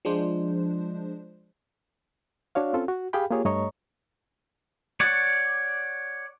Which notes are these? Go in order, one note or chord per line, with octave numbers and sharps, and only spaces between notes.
F3 G#3 D4 C5
D4 F#4 C#5 F5
C4 C#4 F4 A4
F#4
G4 G#4 F5 G5 B5
A#3 F4 G4 G#4 C#5
G2 A3 C#5 D#5 A#5 C#6
C#5 D5 F#5